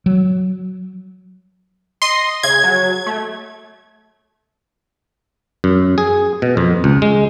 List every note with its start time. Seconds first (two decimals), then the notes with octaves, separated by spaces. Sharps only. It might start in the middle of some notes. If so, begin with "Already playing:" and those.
0.06 F#3
2.02 D#5 C6
2.43 C#3 G#6
2.64 F#3
3.06 A3
5.64 F#2
5.98 G#4
6.42 B2
6.57 F2
6.84 C#2
7.02 G#3